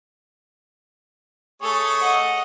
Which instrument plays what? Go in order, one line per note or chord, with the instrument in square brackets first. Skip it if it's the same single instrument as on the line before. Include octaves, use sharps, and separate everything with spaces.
[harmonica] A3 G#4 C#5 [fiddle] A4
[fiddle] D#5 F#5